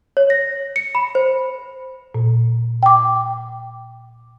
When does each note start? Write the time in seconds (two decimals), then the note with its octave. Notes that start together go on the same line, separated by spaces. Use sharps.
0.17 C#5
0.30 A#6
0.76 C#7
0.95 B5
1.15 C5
2.15 A#2
2.83 G5 D6